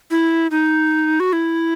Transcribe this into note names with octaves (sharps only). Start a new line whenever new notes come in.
E4
D#4
F#4
E4